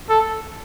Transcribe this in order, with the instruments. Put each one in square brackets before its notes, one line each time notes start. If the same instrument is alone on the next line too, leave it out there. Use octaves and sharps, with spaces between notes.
[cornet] A4